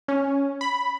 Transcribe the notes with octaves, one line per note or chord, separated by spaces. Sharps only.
C#4
B5